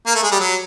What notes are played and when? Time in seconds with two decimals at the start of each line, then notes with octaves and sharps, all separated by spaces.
0.07 A#3
0.15 A3
0.23 G#3
0.31 G3
0.40 F#3